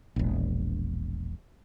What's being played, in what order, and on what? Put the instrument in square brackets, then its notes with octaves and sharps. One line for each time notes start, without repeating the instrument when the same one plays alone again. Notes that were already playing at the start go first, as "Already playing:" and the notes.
[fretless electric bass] E1 A#1